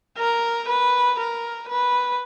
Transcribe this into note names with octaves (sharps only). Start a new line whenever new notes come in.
A#4
B4
A#4
B4